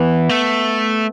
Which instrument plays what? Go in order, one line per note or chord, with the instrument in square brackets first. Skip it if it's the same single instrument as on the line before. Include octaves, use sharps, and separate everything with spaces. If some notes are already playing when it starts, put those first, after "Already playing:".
Already playing: [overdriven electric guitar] E3 [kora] B3
[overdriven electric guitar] A3